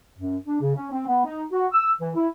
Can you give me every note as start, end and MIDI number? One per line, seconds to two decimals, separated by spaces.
0.19 0.38 42
0.47 0.57 62
0.61 0.72 49
0.76 0.91 61
0.92 1.07 60
1.07 1.23 59
1.25 1.42 63
1.52 1.66 66
1.73 1.90 88
2.01 2.09 52
2.15 2.28 64